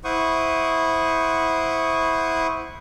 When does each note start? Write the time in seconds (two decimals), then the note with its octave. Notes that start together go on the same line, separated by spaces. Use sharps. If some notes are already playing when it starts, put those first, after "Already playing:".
0.04 E4 C5 F#5 C#6 D#6